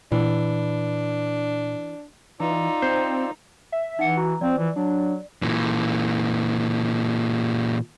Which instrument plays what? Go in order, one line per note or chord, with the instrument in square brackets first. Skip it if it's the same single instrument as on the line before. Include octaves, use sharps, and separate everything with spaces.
[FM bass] A#2 [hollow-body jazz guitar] E3 [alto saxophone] D4
[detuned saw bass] E3 [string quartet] D#4 [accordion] F4 D5 E6
[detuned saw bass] C4 [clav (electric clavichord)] C5
[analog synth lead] E5
[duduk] E3 [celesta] D#4 F#5 C#7
[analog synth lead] F#4 [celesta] A#5
[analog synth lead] F3 [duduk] C4 [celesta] D5
[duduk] E3
[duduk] F#3 [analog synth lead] D4
[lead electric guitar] A#2 E3